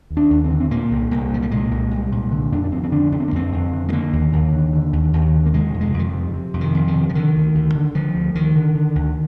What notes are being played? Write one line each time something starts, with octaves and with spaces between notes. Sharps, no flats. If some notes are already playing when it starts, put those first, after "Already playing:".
D#2
D4
D#2
C4
D3
C4
A#2 A#3
C2
C2 A#3
A#2 F3
G3
A#2 G#3
C2
C2
A#2
D3
F2 D4
D4
F2 C4
C4
D3 D4
D3 D4
C4
A#3
F2 C4
F2
D3
G#3
D3 A#3
D#2
D#2
D3
D3
D#2
D#2
D3
A#3
C3 G#3
F2
G#3
F2 D#3
F3
C3
C3
F2
D#3
F2
D#3
C3
F3
D3 D#3
D2
D2
D3
D3 F3
D2
D2 D#3
D3
D3
D2